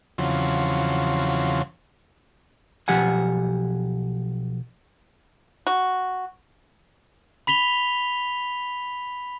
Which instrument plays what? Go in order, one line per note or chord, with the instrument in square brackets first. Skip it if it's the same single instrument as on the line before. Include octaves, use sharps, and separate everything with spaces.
[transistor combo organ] E2 C#3 F3 F#3 C4
[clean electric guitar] B1 F3 G4 F#5 G#5
[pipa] F#4
[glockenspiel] B5 B6 F7 G7